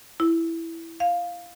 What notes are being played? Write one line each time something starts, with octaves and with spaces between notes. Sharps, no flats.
E4
F5